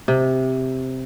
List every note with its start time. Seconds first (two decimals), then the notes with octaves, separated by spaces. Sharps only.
0.08 C3